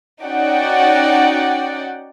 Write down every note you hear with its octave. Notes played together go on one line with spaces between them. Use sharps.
C#4 D#4 F#4 D5 F#5 G5